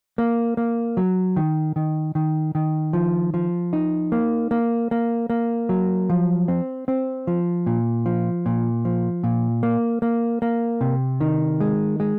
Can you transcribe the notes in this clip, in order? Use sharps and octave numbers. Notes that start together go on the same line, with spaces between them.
A#3
A#3
F#3
D#3
D#3
D#3
D#3
F3
F3
D#4
A#3
A#3
A#3
A#3
F#3
F3
C4
C4
F3
A#2
F3
A#2
F3
A#2
A#3
A#3
A#3
C3
D#3
G#3
G#3